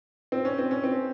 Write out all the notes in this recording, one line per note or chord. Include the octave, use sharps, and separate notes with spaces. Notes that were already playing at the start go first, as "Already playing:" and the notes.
C4
C#4
C4
C#4
C4